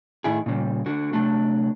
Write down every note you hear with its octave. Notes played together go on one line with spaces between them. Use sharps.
A2 D#3 E4 G#4
A#2 C#3 G3
D3 F#4
C3 F#3 A3 D4